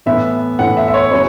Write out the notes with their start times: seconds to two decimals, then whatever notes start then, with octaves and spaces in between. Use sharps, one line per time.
0.06 A2 E3 B3 E5
0.59 A2 E3 B3 F#5
0.77 E5
0.88 E5
0.94 C#5
1.11 C#3 F#3 B3 C#5